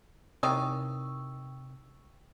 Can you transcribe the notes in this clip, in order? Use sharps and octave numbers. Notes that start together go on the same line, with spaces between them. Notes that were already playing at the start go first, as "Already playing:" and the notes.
C3 D#3 E3 C#4 G5 C#6 D#6 E6